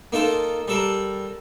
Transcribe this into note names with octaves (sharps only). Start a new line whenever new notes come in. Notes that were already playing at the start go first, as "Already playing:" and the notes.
A#3 D#4 F4 A4
G3 A4 A#4